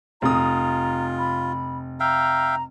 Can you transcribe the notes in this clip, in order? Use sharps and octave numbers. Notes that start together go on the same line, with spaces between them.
F1 F4 A#5 D#6
B5
E5 F5 G5 A#5